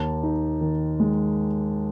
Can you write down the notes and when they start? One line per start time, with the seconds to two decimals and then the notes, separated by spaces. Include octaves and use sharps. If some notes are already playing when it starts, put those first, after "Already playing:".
Already playing: D#2 A5
0.23 D#4
0.61 D#3
1.00 G#3